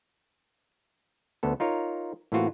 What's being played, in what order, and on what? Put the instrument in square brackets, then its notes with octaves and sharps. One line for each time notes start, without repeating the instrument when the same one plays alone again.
[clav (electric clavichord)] D2 B3 A4
D#4 F4 A#4 C#5
A2 E3 A#3 C4 F4 F#4